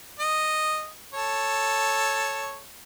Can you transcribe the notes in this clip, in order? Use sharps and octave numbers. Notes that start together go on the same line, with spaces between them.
D#5
A4 C#5